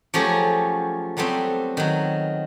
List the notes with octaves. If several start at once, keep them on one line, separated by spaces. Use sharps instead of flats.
F3 F#3 A3 C#4 G4 G#4
F#3 G3 A3 B3 C4
D#3 F#3